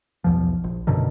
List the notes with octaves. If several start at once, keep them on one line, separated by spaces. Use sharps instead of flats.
B1 E2 F3
A#1
F#2 B2 D3 D#3